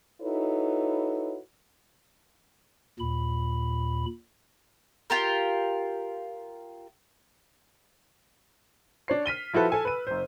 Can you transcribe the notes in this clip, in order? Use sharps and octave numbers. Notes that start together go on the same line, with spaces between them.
D#4 E4 F#4 A4 B4 C#5
D#2 A#2 B5
F4 G4 A#4
D4 C#5 C7
F6 B6 D#7 G7
F3 E4 F#4 A4 B4
A4 G#5 E6
B4 D#7
F#1 C5